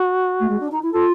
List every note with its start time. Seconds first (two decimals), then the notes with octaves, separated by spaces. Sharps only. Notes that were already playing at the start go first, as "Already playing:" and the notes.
Already playing: F#4
0.40 A3
0.48 G#3
0.59 D4
0.71 D#4
0.82 E4
0.92 F4 A4